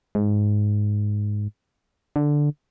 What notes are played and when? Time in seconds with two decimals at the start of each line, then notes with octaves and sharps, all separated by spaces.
0.15 G#2
2.16 D3